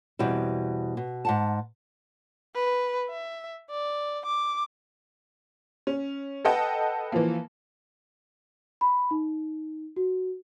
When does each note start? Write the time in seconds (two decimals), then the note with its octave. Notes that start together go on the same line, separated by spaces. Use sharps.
0.19 E2 B2 G3 C4 E4
0.97 B2
1.25 G#2 F#5 A5
2.55 B4
3.09 E5
3.70 D5
4.25 D6
5.87 C#4
6.45 A4 B4 D#5 F#5 G5 A5
7.12 E3 F3 A#3
8.81 B5
9.11 D#4
9.96 F#4